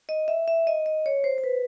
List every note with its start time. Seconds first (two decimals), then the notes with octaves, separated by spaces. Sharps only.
0.09 D#5
0.28 E5
0.48 E5
0.67 D#5
0.86 D#5
1.06 C#5
1.24 C5
1.38 C5
1.44 B4